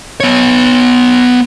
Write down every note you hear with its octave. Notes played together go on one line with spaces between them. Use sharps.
B3 C#5